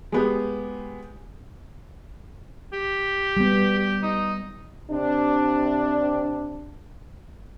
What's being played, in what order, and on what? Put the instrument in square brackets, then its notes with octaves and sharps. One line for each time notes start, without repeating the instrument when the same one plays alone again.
[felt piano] G#3 B3 G4
[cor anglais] G4
[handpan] G3 B3
[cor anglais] G4
D#4
[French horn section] C3 D4